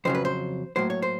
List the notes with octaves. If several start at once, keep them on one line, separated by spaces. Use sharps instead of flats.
F2 C#3 F#3 C5
B4
C5
A2 F#3 A#3 C5
C#5
C5